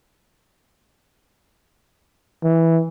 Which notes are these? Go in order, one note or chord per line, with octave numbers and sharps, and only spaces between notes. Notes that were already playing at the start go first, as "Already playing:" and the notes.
E3